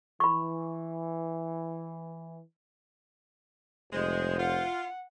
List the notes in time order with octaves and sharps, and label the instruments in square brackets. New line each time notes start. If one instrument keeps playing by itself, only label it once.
[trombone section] E3 [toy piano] B5 C#6
[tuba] F1 [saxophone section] G#3 [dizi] C5
[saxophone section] F4 [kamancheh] F#5